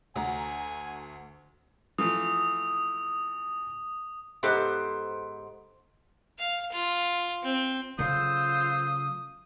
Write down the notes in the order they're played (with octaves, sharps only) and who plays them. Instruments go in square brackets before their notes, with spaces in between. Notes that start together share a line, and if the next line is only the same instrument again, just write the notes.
[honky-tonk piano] D2 F#4 A#5 [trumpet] G#5
[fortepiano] E3 F3 A3 [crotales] D#6
[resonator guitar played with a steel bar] G#2 B3 G4 A4 C5
[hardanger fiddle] F5
F4
C4
[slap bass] C#3 F#3 A3 [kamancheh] F4 E6 [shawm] C5 [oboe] D#6